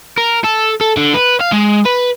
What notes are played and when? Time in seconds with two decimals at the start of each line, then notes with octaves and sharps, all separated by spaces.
0.18 A#4
0.44 A4
0.81 A4
0.97 D3
1.14 B4
1.40 F5
1.52 G#3
1.85 B4